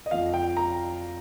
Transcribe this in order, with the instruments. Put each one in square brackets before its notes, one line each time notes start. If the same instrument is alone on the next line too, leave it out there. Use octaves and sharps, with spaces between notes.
[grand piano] D#5
F2 F3 F5
G5
A#5